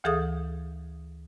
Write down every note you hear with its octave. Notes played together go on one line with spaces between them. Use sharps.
D2 E3 G#4 A4 F5 D#6